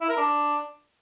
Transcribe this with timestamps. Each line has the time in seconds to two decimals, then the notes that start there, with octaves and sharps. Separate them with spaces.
0.01 E4
0.09 A#4
0.17 D4